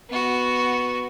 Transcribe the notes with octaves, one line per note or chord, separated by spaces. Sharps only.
B3 F#4